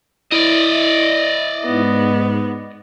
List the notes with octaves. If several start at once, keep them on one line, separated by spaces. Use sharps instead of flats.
E4 D5 D#5
G#2 B3